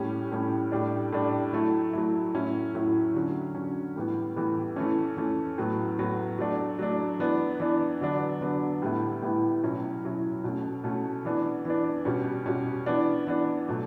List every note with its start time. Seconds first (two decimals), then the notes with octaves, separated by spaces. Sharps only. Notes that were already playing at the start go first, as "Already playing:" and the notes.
Already playing: A2 G3 C#4
0.32 A2 G3 C#4
0.72 A2 G3 D4
1.12 A2 G3 D4
1.53 F#3 A3 E4
1.93 F#3 A3 E4
2.34 A2 F#3 C#4 E4
2.75 A2 F#3 C#4 E4
3.14 D3 F#3 C#4
3.55 D3 F#3 C#4
3.96 A2 E3 G3 B3
4.36 A2 E3 G3 B3
4.76 E3 A3 C#4
5.17 E3 A3 C#4
5.58 A2 F#3 B3
5.99 A2 F#3 B3
6.38 F#3 A3 D4
6.79 F#3 A3 D4
7.19 E3 B3 D4
7.60 E3 B3 D4
8.01 D3 F#3 B3 D4
8.41 D3 F#3 B3 D4
8.82 A2 G3 B3 E4
9.22 A2 G3 B3 E4
9.63 B2 F#3 C#4 E4
10.03 B2 F#3 C#4 E4
10.44 B2 A3 C#4
10.84 B2 A3 C#4
11.25 E3 B3 D4
11.65 E3 B3 D4
12.05 B2 G3 C#4
12.46 B2 G3 C#4
12.86 E3 B3 D4
13.27 E3 B3 D4
13.68 B2 F#3 A3